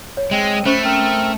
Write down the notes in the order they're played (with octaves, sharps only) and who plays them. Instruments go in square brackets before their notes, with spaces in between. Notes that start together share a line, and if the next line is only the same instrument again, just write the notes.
[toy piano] C#5
[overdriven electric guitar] G#3 [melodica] C4
[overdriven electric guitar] A3 [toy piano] C#4 C5 C#6 [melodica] B5
[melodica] C4 A#4